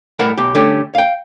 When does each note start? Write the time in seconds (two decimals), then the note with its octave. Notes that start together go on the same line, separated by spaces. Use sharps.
0.19 A2 G3 A#4 B4 F#5 A5
0.38 B1 B2 G4
0.55 D3 G3 A3 C#4 G4
0.95 F5 G5